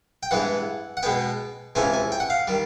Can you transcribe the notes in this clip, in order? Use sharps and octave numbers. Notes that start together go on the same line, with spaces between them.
G5
G2 E3 G#3 B3 F#5
F#5
B2 G#3 B3 G5
C#2 C3 E3 A3 C#4 G#5
G#5
G5
F#5
F5
D#3 G3